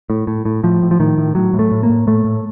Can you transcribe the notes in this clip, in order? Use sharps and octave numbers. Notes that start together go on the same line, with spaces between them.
A2
A2
A2
A2 F3
A2
F3
A2 D#3
A2
A2 F#3
A2
A3
A2
A#3
A2
A2 A3
A2